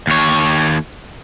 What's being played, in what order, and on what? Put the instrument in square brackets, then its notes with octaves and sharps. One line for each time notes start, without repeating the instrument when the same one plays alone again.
[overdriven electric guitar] D#2 C#5